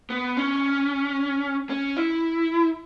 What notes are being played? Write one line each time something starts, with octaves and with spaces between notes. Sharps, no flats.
B3
C#4
C#4
E4